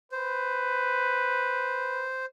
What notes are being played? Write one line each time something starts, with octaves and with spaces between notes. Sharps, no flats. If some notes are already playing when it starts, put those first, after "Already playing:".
B4 C5